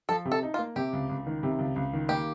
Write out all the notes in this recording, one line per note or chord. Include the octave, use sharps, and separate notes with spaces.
F3 A4
C3
A4
D#4
F4
A#3
C3 G4
C#2
C#2
D#3
C3
C#2
C#2
D#3
A#3 G4